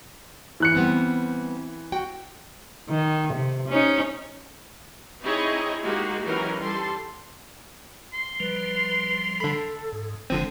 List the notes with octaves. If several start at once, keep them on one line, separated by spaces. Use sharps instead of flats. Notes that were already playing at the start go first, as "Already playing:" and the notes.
E3 F#6 C#7
G3 B3 C4
F#4 G5
D#3
C3
C#4 D#4
C4 D#4 E4 G#4 C#5 D#5
G#3 A#3 D#4 F#4 G4
E3 F#3 C#4 D#4 G4 A#4
G3 A4 C6
C6
F3 G3 B4
D3 A4 B5
G#2
F#1 D3 D#3 F3 G#3 C4